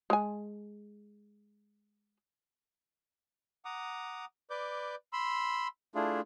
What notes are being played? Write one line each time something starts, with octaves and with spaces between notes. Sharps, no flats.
G#3 G#5
F#5 A#5 D6 D#6
B4 D5 D6 G6
B5 C6 E6
A3 D4 E4 F4 G#4